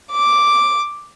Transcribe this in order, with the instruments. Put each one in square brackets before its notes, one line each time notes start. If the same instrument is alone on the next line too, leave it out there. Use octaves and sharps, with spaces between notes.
[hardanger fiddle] D6